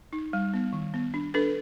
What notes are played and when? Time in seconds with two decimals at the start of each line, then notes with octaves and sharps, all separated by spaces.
0.13 D#4
0.33 G3
0.54 B3
0.73 D#3
0.94 B3
1.14 D4
1.34 D4 A4 B4